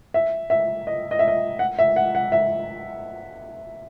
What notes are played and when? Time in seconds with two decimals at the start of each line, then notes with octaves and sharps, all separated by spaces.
0.14 E5
0.50 E5
0.87 D#5
1.11 D#5
1.19 E5
1.28 D#5
1.59 F#5
1.79 E5
1.96 F#5
2.15 F#5
2.32 E5